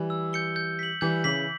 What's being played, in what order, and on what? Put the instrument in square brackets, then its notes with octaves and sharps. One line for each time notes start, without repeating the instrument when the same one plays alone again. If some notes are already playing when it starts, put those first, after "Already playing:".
Already playing: [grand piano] E3 G3
[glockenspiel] E6
G6 C#7 G7
G6
B6 F#7
[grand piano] E3 G3 [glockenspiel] G6
[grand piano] C#3 E3 [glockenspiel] B6 F#7